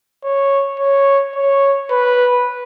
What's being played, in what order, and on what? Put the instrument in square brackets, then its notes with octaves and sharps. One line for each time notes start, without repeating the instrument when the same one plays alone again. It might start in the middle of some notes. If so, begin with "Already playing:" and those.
[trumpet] C#5
C#5
C#5
B4